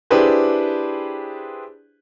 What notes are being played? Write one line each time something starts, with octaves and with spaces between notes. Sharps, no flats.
D4 E4 G4 G#4 B4 C5